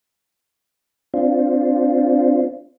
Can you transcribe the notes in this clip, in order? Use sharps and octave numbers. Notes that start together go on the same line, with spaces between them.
C4 D4 F4